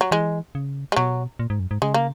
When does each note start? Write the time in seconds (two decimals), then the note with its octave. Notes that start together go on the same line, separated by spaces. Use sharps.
0.01 F#3
0.11 E3 G#3
0.55 C#3
0.92 G#3
0.96 B2 F#3
1.39 A#2
1.50 G#2
1.60 F#2
1.71 G#2
1.82 C#3 G#3
1.94 A#3